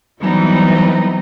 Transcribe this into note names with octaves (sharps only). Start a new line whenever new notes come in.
E3 F#3 G3 B3 C4 D#4